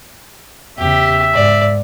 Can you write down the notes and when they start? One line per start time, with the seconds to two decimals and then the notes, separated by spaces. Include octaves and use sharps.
0.78 E2 C#3 G4 E5
1.34 G#2 D5